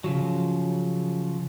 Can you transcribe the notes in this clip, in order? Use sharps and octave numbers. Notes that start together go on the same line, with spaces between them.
C#3 F3 F#3